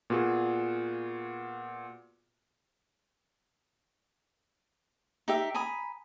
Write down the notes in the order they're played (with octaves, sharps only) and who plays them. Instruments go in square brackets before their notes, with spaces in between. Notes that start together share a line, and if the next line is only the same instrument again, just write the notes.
[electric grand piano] A#2 B3 F4 F#4 G#4
[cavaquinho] D#4 G4 E5
G#5 A#5 B5 D#6